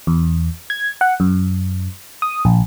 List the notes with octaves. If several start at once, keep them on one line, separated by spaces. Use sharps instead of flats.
E2
G#6
F#5
F#2
D#6
A#1